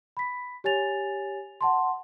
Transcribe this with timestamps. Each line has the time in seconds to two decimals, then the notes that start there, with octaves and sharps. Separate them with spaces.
0.17 B5 B6
0.64 G4 C#5 G#5 A6 F7
1.61 F#5 A5 C6